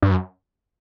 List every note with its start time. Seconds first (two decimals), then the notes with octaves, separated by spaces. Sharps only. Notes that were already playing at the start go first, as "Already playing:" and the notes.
0.02 G2
0.11 F#2